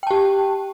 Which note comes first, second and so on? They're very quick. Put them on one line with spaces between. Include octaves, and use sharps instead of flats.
G5 A5 G4